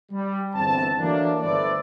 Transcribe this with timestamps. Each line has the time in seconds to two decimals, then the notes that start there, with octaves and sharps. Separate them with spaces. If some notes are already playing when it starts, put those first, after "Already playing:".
0.12 G3
0.55 G1 E2 D3 C4 A5
0.99 E3 F#3 A3 A#3 D4
1.42 G1 A3 B4 C5 D5